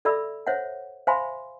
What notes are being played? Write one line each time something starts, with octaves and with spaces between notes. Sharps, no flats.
A4 D5 E5 B5 E6
C5 C#5 E5 F#5
C5 E5 F5 G#5 B5 C6